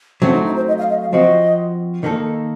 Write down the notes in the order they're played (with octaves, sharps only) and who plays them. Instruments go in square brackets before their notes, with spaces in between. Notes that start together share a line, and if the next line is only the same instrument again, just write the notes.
[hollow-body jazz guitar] F#3 A3 C4 F#4 [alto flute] C#4
[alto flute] D#4
D#4
C5
D#5
F5
D#5
F5
[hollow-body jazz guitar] F3 C4 F#4 [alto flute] D#5
[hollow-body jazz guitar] D#3 A#3 D#4 A4